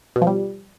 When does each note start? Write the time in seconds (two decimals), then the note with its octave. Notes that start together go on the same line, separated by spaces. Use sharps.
0.16 B2
0.21 F3
0.27 G3